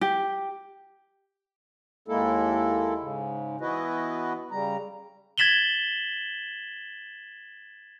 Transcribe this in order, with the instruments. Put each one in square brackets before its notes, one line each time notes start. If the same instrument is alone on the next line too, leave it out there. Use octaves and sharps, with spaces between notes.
[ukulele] G4
[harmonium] D#2 G#3 A#3 E4 A4
G#2 C#3
E3 B3 E4 F#4 B4 D#5
C#3 G3 A#5
[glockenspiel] G#6 A6 B6 E7 F#7 G7